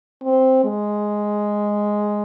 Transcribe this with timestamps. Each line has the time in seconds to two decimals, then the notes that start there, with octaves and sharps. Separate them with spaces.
0.24 C4
0.65 G#3